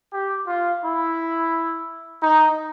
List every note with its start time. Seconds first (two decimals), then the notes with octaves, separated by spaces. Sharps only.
0.12 G4
0.46 F4
0.82 E4
2.20 D#4